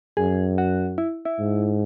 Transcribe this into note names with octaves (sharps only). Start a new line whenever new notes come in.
F#2 G#4
F#4
E4
E4
G#2